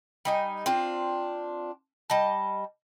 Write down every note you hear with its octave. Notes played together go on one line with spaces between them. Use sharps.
G3 D#4 G#5
C4 D4 F4
G3 D#5 A5